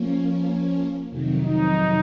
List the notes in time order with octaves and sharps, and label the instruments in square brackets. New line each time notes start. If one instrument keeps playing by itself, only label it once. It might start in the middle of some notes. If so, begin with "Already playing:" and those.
Already playing: [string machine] F3 A#3 C#4
F2 C3 D#3 F#3
[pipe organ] D#4